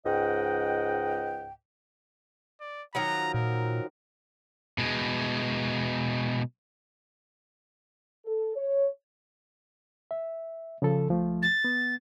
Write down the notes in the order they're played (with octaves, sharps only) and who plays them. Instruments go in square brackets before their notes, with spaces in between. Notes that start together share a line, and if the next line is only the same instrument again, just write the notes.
[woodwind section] C#2 G#2 D#5 F#5 G5
[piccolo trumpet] D5
[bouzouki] D#3 F3 F#3 [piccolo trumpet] A#5
[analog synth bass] A#2 [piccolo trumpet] A#4
[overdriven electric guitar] B2 G#3
[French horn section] A4
C#5
[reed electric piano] E5
C#3 F3 A4
C#2 F3 A3
[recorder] A6
[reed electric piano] B3